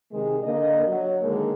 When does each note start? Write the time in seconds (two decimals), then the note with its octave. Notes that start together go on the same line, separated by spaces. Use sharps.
0.11 C3 D#3 G#3
0.43 D3 A#3 D#5
0.85 F#3
1.22 D3 D#3 G#3 A#3